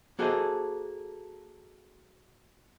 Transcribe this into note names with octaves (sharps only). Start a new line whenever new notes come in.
A#3 F#4 G#4 A4 C5 D#5